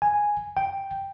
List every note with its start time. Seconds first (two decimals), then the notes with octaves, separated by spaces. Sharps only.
0.02 G#5
0.57 G5